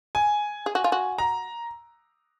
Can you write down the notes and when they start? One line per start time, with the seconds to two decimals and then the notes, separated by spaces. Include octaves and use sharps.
0.15 G#5
0.66 G#4
0.75 F#4
0.84 F4
0.92 F#4
1.18 A#5